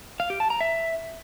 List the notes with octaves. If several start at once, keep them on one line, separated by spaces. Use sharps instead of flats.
F5
G4
A5
A#5
E5